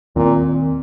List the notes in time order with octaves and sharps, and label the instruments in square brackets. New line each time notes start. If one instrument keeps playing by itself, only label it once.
[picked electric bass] D#2 D#3 C4 [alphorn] A#2